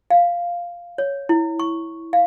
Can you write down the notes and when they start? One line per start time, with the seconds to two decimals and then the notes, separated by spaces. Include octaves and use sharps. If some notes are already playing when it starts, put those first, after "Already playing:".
0.11 F5
0.98 C#5
1.29 E4
1.59 C#6
2.13 F5